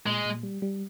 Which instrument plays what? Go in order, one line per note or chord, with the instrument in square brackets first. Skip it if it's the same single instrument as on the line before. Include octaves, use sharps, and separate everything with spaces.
[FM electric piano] A#2 [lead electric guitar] G#3
[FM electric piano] A#2
G3
G3